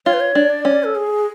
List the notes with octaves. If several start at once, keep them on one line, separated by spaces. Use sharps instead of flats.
F4 C#5
B4
C#5
D4
D5
C#4
A4
G#4